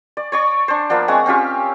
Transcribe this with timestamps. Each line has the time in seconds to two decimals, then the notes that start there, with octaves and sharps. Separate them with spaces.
0.17 D5
0.32 C#5 D5 C#6
0.68 D4 C5
0.90 F3 A#3 B3 D4
1.08 G#3 C4 C#5 F#5
1.26 C4 C#4 F4 G4